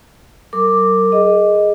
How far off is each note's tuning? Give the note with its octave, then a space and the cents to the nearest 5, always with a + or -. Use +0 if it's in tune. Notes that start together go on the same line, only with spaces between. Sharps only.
F#3 +45 A#4 -30 D6 +0
G#4 +5 D#5 +0